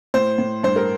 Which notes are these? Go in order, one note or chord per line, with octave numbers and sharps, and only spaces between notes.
A2 C5
A2
G2 C5
A#4